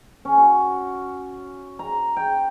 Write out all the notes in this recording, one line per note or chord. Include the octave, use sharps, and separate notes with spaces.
C#4
F#4
A#5
G5